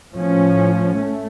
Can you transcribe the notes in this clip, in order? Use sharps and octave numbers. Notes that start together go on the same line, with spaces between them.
A2 F3 C#4
A3